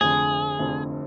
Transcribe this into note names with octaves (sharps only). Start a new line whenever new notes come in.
F1 F2 D3 G#4
F1 F2 D3